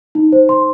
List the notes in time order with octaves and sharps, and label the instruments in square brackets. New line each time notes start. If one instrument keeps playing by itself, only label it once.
[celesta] D#4
C5
C6